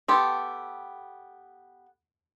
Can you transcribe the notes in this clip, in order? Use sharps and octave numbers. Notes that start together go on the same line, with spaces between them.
B3 G4 A4 C6